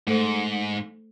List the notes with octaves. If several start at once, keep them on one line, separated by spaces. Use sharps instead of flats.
G#2 A3 A4 C5